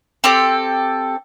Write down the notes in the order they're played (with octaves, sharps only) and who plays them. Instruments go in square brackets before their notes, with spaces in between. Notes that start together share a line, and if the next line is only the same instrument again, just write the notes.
[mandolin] C4 G4 A4